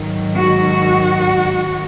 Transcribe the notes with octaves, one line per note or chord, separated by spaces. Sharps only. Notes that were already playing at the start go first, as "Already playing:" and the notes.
Already playing: G#2 D#3 F#3
F#4